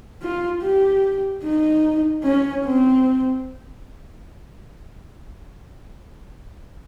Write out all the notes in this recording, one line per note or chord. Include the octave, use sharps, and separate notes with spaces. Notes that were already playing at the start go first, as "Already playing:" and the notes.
F4
G4
D#4
C#4
C4